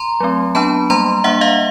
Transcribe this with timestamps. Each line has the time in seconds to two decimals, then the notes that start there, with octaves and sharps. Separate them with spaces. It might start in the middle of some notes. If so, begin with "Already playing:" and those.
Already playing: A#5 C6
0.20 F#3 A3 C4
0.55 F#3 B3 D4 A5 B5
0.90 G3 A#3 D4 A#5 C6
1.24 G3 A#3 D4 E5 F#5
1.41 D#5 F5